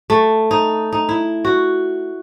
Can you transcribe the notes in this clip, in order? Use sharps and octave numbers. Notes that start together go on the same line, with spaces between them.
A3
D#4
D#4
E4
F#4